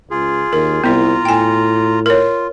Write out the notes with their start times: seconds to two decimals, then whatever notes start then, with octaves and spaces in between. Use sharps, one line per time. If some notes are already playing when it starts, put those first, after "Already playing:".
0.11 C#2 F4 G#4
0.53 D#2 A#4
0.84 C2 B3 E4 F4 A#5
1.25 A2 G5 G#5
2.06 F4 A#4 C#5